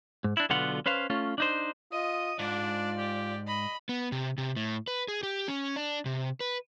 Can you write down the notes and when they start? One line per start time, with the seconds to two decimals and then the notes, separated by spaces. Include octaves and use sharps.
0.24 G#2
0.37 D4 E4
0.50 B1 B2 D3 B3 F4 F#5
0.86 C#4 B4 C5 F5
1.10 A3 C#4 F4
1.38 D4 D#4 C5
1.92 F4 D#5 D#6
2.39 G#2 D4 F4 D5
2.98 G4
3.47 D#5 B5
3.89 B3
4.12 C3
4.38 C3
4.56 A2
4.88 B4
5.08 G#4
5.23 G4
5.48 C#4
5.76 D4
6.06 C3
6.40 B4